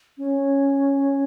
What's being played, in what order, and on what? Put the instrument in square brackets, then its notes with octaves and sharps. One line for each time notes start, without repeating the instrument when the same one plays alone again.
[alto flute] C#4